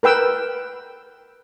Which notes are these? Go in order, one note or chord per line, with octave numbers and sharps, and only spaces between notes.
A#4 B4 G5 E6